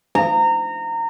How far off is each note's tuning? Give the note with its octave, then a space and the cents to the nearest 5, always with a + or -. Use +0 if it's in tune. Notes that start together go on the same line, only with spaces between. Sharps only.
A#5 -25